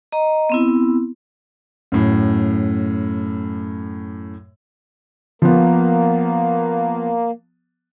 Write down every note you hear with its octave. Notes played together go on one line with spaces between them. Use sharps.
D#5 A#5
B3 C4 E4
F#2 A2
F3 A#3 B3